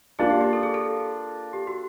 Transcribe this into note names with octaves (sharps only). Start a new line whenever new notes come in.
A#3 D4 F4 G#4
G4
G4
A4
G#4
A4
G4
F#4